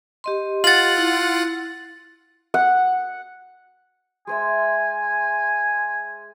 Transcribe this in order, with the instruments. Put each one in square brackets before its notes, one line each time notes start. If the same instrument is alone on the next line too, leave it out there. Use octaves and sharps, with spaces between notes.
[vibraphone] G4 D#5 C6
[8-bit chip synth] F4 F#5 [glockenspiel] A6 F#7
[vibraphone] E4
[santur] F#5
[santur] G#3 C5 E5 [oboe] G#5